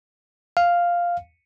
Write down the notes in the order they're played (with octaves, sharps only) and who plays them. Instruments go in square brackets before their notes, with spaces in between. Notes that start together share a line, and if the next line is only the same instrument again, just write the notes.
[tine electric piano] F5